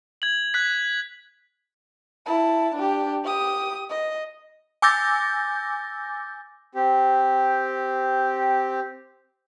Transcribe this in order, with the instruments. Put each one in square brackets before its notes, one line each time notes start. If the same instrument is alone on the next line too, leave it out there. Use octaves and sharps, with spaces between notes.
[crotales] G#6 F#7
F#6 G#6 B6
[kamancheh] E4 A5
D4 G4
G4 D#6
D#5
[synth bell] G#5 D6 E6 G6 A6 A#6
[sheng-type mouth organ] C4 G4